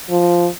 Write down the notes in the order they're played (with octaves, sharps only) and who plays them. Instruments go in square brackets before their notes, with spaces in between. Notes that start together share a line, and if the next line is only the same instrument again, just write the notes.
[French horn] F3